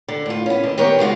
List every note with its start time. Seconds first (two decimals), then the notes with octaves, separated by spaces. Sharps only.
0.08 D3
0.26 A2 F4
0.46 B3 C#4
0.63 D#2 D3 D#5
0.78 D#3 B3 G4 C#5
0.99 C#3 G#3 F4 F#4